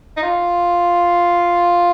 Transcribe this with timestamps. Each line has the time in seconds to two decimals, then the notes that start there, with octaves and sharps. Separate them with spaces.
0.17 D#4
0.22 F4